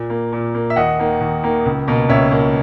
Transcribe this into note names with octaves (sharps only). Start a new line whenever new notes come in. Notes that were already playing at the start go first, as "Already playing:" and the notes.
Already playing: A#2
A#3
A#2
A#3
E5
D#2 D#5 F#5
D#3 A#3
D#2
D#3 A#3
C#2
B2 A#3
C#2 C#5 E5
B2 A#3